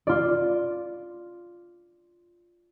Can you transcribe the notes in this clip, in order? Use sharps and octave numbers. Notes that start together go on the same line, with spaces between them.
F4 D5